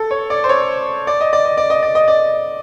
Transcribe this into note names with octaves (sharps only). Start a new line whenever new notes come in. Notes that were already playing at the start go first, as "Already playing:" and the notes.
Already playing: A4
C#5
D5
C5
C#5
D5
D#5
D5
D#5
D5
D#5
D5
D#5
D5